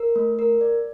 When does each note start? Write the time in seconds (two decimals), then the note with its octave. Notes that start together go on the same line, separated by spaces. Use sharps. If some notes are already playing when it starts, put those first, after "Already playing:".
Already playing: A#4
0.16 A3
0.39 A#4
0.61 D5